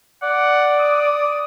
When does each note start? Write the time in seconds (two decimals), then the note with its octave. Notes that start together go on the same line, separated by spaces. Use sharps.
0.23 D5 F#5
0.81 D#6